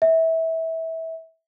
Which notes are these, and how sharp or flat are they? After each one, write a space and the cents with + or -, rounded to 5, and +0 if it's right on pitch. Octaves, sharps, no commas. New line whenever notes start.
E5 -20